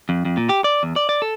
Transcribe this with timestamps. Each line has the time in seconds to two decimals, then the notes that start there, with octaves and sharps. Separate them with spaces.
0.09 F2
0.25 F2
0.37 A#2
0.49 G4
0.64 D5
0.83 E2
0.96 D5
1.09 D5
1.22 A4